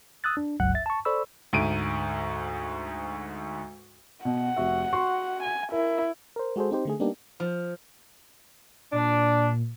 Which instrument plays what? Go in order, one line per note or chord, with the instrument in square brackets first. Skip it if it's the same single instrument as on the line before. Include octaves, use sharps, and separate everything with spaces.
[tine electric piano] D#6 E6 F#6 A6
D4
G1 C#2 G2 F#3 F#5 F#6
E5 A6
A5 C#6
A4 C5 D5 B5 C#6 E6
[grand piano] D2 G#2 D7 D#7
[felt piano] B2 [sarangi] F#5
[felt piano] F1 F#4 E5
F#4 C6 C#6
[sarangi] G#5
[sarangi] E4 [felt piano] A#4
[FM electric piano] A#4 C5
G#3 F#4 G#4 A4 C5
C4 D#4 G4 C5
D3 A3 G#4
G3 A#3 B3 D4 D#4 G4
[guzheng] F3
[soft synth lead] A#2 [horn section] D4